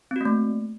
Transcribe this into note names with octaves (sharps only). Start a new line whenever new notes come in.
A3 A#3 C4 F#4